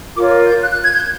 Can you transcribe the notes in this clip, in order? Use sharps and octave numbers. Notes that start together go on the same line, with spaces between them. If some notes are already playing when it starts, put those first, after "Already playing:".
F4 A#4 C#5 D6
G6
F#6
F#6
G#6
G6